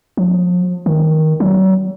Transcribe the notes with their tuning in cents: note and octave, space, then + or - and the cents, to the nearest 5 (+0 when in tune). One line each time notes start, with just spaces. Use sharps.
F3 +40
D#3 +10
F#3 +40